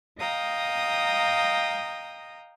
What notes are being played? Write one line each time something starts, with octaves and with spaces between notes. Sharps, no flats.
D#5 F5 G5 A#5 D#6